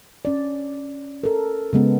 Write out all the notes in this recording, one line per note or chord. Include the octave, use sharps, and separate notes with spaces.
C#4 D5
A4 A#4
C#3 G#3 B3